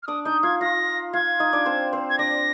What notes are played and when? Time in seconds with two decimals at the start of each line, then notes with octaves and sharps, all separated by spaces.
0.03 F6
0.07 D4 D5 D#6
0.25 D#4 D#5 G6
0.43 F4 F5 G#6
0.60 F4 F5 A#6
1.13 F4 F5 G#6
1.40 D#4 D#5
1.53 D4 D5
1.66 C4 C5
1.93 C4 C5
2.10 G#6
2.19 D4 D5 A#6